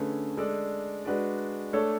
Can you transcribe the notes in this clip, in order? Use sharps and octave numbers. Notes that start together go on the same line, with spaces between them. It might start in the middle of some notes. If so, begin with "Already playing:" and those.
Already playing: D3 A3 C#4 G#4 B4
G#3 D4 A4 D5
G#3 D4 F#4 B4 D5
A3 D4 A4 C#5